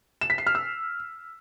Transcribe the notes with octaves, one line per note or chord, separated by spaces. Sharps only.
E7
B6
C7
F6
E6